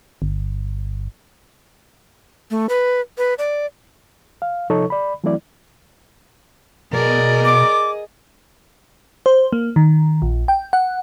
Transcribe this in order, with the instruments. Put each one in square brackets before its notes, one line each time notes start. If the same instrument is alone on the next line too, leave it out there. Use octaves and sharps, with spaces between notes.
[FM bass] G1
[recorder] A3
B4
B4
D5
[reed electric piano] F5
C3 F3 D#4 A4 C#5 C#6
D5 B5
E3 F#3 A3 C4 E4 D5
[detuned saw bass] B2 [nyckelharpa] G#4 D#5 [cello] A#4 D5
[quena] D6
[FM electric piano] C5
A#3
D#3
A#1
G5
F#5